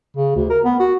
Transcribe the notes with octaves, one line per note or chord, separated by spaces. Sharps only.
C#3
D2
A#4
B3
F#4